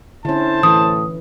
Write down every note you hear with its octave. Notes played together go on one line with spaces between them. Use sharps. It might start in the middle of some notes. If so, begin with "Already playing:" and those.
D3 C#4 E4 C5 A5
A2 E3 D#6